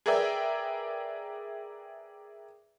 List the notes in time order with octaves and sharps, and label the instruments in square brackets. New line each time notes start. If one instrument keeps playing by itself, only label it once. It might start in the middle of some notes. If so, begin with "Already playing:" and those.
[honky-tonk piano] G#4 A#4 B4 D5 E5 G5